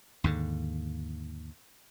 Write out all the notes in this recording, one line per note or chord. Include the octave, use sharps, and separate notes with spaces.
D#2 G#2 D3